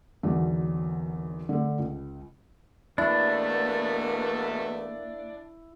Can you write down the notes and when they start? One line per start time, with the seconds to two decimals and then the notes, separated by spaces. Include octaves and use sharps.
0.23 G#1 E2 D3 F#3
1.49 D3 A3
1.78 C#2
2.98 E2 B2 A3 A#3 D4 E4